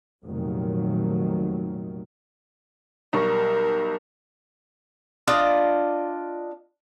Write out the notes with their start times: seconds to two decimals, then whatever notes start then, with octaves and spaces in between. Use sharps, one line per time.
0.25 F1 A#2 D#3 F#3
3.13 B1 G3 A#4 C#6
5.27 D4 F4 D5 D#5